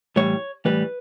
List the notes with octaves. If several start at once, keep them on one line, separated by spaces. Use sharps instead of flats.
A2 E3 G3 C#5
A2 E3 G3 B4